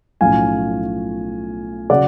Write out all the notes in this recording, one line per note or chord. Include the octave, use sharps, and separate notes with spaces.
B1 A2 F3 A3 C#4 F5 G#5
C#3 F#3 D5 F#5